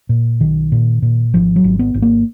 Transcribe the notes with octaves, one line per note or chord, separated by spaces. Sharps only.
A#2
B1 D#3
A#2
A#2
G#1 F3
F#3
G#1
B3
G#1
A#3